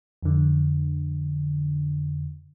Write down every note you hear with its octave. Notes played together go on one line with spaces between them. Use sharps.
F2 D3